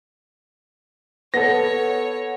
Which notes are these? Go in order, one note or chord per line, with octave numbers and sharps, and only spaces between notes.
B3 A4 C#5 F#5 A#6